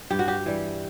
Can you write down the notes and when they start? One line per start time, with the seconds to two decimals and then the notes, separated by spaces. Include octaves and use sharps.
0.10 G2 G4
0.19 F#4
0.28 G4
0.46 E3 G3